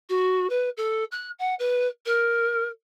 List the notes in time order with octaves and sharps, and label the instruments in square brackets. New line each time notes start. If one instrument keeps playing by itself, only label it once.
[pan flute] F#4
B4
A4
F#6
F#5
B4
A#4